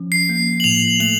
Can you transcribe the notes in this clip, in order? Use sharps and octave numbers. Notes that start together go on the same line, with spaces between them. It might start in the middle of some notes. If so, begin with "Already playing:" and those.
Already playing: F3 C#4
C7
A#3
F#7
A2 F7
A3 F#7